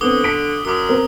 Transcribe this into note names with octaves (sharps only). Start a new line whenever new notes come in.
D3 B3 C4 D6 D#6 G7
B6 D7
F#2 D6 D#6
C4 A#4 C5